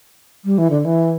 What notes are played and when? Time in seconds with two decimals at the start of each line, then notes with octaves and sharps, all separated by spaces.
0.45 G3
0.58 E3
0.70 D3
0.85 E3